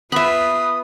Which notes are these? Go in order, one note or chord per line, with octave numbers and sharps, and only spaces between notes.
B3 F4 B4 E5 B5 D#6